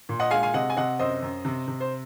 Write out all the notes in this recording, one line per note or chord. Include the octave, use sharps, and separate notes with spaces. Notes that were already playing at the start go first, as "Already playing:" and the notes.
A#2
D#5 F#5
G#3 F5 G#5
F5 G#5
C3 D#5 F#5
G#5
C3 D#5 F#5
F#2 C5 D#5
F#2
C3
C3
C5